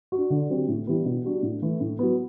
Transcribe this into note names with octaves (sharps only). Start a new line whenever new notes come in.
D4 F#4
D3
F#3 C4 G4
A2
E3 G3 B3
B2
G3 D4 F#4
A2
E3 A3
A2
F#3 B3